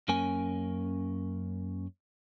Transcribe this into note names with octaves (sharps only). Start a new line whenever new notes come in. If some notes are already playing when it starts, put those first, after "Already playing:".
F#2 A#3 C#4 A#4 G#5